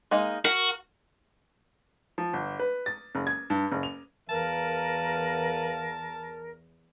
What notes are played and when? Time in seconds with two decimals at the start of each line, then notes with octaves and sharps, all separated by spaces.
0.11 G#3 A#3 D#4
0.45 F#4 A#4
2.18 F3
2.33 G1
2.59 B4
2.86 A6
3.15 F#1
3.27 G#6
3.50 G2
3.72 F#1
3.83 F7
4.29 E2 A#4 B4 F5 A5